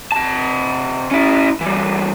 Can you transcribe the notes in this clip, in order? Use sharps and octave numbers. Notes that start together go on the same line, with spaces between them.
C3 A5
C#4 E4
E3 G3